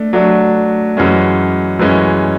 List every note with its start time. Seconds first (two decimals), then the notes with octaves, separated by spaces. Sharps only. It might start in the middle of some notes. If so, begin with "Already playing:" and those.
Already playing: A3 D4
0.13 F#3 A3 D4
0.97 F#2 E3 G#3 C#4
1.79 F#2 E3 G#3 C#4